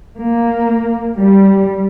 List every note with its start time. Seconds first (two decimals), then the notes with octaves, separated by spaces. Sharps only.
0.18 A#3
1.16 G3